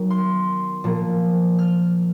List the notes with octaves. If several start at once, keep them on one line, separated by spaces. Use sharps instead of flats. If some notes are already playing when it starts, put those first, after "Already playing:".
Already playing: D#3 F#3 B3
C6
A#2 F3 A#3
F6